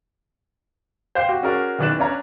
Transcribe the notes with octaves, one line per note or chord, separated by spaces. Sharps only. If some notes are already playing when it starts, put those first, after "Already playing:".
C5 F5 G5 G6 C7
F#4 G4
C#4 F#4 G#4 A#4 D5
F#1 D#3 E3 D5 F#6 E7
C#4 D4 C#5 A#5